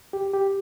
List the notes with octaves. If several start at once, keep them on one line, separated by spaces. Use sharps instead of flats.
G4
G4